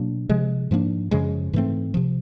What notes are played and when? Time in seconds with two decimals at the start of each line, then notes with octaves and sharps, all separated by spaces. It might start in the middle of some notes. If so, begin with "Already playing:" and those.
Already playing: B2 F#3 A#3 D4
0.29 C3 F3 G#3
0.71 G#2 F3 A#3 D4
1.11 F#2 C#3 F3 G#3
1.53 G#2 E3 A3 C4
1.94 C3 F3